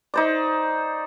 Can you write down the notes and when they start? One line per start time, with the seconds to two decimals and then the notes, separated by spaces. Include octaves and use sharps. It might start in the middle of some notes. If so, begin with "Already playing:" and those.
0.14 D#4 C5 D5